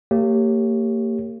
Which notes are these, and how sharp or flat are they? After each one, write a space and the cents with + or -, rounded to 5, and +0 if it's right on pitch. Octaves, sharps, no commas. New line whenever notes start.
A#3 -35 G4 +0 C#5 -5